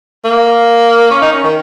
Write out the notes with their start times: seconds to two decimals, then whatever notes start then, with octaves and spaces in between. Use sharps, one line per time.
0.24 A#3
1.11 C#4
1.22 D#4
1.32 C#4
1.43 D#3